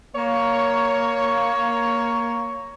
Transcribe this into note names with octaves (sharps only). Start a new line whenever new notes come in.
A#3 C#5